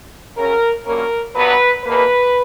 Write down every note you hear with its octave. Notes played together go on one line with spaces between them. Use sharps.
C#3 F#3 C#4 A#4
G2 F#3 A#3 C#4 A#4
G2 F#3 B3 B4
E2 B2 A#3 B4